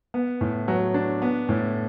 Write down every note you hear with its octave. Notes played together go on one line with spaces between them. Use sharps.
B3
A2
F#3
D4
B3
A2